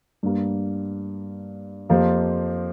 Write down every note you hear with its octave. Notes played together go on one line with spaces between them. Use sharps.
G2 G3 A#3
F2 F3 A#3 G4 C5